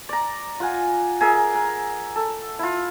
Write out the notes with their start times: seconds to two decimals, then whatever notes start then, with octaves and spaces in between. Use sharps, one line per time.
0.09 D5 A#5
0.60 F4 F#5 G#5
1.21 G#4 A#4 E5
1.54 A#4
2.16 A4
2.59 E4 F4